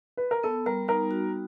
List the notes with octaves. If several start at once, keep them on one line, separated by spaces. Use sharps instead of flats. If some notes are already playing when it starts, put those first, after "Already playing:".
B4
A#4
B3 A4
G3 A#4
D#4 A#4
F#4